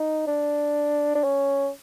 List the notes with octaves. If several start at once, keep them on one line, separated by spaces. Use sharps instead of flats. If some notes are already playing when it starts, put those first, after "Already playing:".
Already playing: D#4
D4
D4
C#4